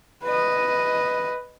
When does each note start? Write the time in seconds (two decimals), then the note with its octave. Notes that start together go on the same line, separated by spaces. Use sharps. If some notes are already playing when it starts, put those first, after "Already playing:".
0.24 B4 D#5